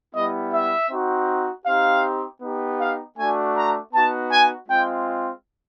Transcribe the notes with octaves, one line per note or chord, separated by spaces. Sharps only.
G3 B3 E4 D#5
E5
C4 D#4 F#4
C4 D#4 G4 F5
B3 D#4 G4
F5
A3 D4 F#4 G#5
A#5
B3 D#4 F#4 A5
G#5
G#3 C4 F4 G5